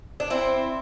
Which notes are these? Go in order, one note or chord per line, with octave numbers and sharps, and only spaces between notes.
D4
C4 E4